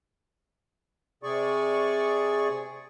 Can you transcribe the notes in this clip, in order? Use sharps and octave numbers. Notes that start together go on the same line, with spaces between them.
C3 G#4 D5 C#6